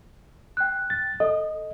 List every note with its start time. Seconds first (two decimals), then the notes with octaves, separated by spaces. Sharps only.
0.57 G5 F#6
0.90 A6
1.20 A4 D#5